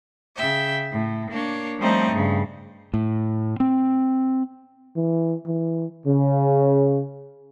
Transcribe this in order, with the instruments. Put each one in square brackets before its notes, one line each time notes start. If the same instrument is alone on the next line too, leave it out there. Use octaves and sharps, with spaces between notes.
[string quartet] C#3 E5 G5
A2
A#3 D4 C#5
F3 G3 A3 C4 C#4 D#4
G2 C#3
[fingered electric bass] A2
C4
[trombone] E3
E3
[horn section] C#3